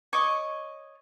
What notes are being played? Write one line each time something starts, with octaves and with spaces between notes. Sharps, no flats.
C#5 D#5 C#6 D6